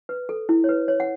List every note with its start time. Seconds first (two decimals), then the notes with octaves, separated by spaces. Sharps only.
0.09 B4
0.29 A4
0.49 E4
0.64 C#5
0.69 B4
0.88 C#5
1.00 F#5